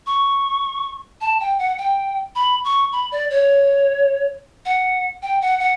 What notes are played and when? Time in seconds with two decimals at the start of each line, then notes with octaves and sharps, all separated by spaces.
0.07 C#6
1.21 A5
1.40 G5
1.59 F#5
1.78 G5
2.35 B5
2.65 C#6
2.93 B5
3.12 D5
3.30 C#5
4.65 F#5
5.22 G5
5.41 F#5
5.60 F#5